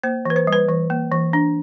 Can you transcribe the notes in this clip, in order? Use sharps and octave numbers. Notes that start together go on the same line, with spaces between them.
A#3 C5
E3 B4
C5
G3
B4
E3
A#3
E3
D4